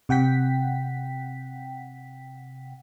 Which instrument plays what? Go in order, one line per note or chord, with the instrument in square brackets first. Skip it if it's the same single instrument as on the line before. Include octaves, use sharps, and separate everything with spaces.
[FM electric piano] C3 F#5 G5 B6